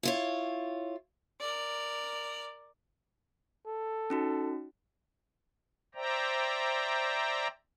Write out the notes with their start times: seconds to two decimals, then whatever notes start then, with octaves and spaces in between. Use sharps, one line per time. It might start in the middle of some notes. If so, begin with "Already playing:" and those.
0.03 E4 F4 C#5
1.41 A#4 D5
3.66 A4
4.10 C#4 D#4 F#4
5.95 C5 D5 E5 G5 A#5